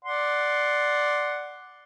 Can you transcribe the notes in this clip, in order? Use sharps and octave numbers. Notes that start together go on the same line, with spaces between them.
D5 F#5 C6